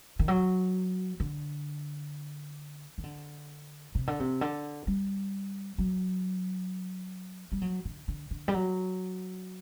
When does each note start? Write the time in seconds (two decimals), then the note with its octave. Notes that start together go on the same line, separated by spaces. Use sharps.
0.19 D#3
0.28 F#3
1.20 D3
2.98 D#3
3.04 D3
3.95 C3
4.07 D3
4.20 C3
4.41 D3
4.87 G3
5.78 F#3
7.52 G3
7.62 F#3
7.85 D3
8.08 D3
8.31 D3
8.48 G3
8.54 F#3